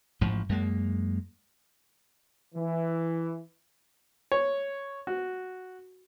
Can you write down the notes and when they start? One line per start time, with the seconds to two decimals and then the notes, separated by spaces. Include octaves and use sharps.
0.21 A1 G#2 F3
0.49 F#2 G#3 A#3
2.55 E3
4.32 C#5
5.07 F#4